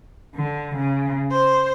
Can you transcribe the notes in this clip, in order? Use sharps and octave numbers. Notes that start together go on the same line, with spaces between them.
D3
C#3
C5